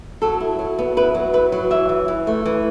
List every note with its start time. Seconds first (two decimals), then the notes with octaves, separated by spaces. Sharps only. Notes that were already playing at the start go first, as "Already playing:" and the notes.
0.22 F#3 A4
0.40 E4
0.59 F#3
0.79 B3
0.97 E4 B4
1.15 F#3
1.33 E4 B4
1.52 F#3
1.71 E3 E5
1.89 E3
2.08 E3
2.27 A3
2.46 E3